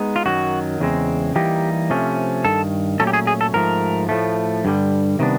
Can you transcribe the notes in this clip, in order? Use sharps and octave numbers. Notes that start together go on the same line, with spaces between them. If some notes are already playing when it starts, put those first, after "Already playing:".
Already playing: G#3 B3 D#4
F4
F#2 D#3 F#3 F#4
E2 C#3 G#3 C4
E3 G3 A#3 D#4 G4
C3 F3 A3 C#4
G2 D#3 A4
A#2 F#3 A3 C#4 A4
G4
G#4
G#4
A4
G#2 F3 A3 A#4
A2 F3 A3
G2 D3 G3
C3 D#3 G3 B3 D4